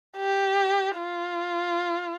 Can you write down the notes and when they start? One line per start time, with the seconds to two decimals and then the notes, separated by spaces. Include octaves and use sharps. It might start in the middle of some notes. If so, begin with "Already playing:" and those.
0.17 G4
0.97 F4